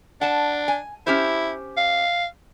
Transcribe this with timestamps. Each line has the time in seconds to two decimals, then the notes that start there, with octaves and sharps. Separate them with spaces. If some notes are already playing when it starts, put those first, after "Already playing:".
0.21 D4 F#5 A5
0.68 G#5
1.07 C#4 E4 G4 C5
1.77 F5